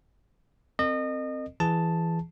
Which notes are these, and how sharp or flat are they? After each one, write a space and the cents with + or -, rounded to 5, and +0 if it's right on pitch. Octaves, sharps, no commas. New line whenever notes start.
C4 +0 A#4 -45 D#5 -30
E3 +15 G#4 +0 A5 +0